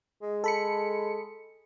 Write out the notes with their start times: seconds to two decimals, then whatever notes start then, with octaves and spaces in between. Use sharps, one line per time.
0.22 G#3
0.44 A4 B5 C#7